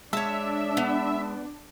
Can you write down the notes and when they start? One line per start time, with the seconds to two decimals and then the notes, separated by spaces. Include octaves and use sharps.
0.13 G#3 D4 C#5 E5 A5
0.77 B3